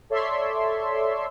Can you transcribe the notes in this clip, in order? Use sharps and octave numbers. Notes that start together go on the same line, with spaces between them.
A4 C#5 D5 E5 C6